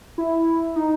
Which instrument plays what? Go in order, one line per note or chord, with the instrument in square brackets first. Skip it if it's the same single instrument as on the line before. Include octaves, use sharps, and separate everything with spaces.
[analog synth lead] E4
D#4